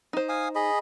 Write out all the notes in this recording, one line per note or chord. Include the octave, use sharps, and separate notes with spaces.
D#4 C5
F5 G#5 D#6
G#4 D#5 B5